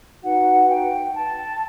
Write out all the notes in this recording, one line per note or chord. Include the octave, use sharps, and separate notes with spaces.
D#4 F#4 B4 F#5
G5
A5